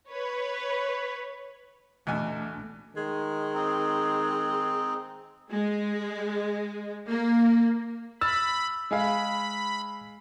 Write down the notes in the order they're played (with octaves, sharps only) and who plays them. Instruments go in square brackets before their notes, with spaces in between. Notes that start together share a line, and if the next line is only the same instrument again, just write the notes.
[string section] B4 C#5
[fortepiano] E2 B2 G#5 [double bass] A3 D4
[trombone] D#3 [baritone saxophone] G#3
[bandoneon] C4 D#4
[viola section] G#3
A#3
[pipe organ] B5 [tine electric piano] E6 [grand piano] F6 A6
[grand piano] G#3 G#4 F5 [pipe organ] B5